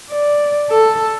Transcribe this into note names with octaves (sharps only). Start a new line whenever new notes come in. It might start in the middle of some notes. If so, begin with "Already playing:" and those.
D5
A4